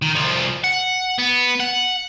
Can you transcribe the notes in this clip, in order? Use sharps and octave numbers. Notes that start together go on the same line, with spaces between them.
D#3
C2 F3
F#5
B3
F#5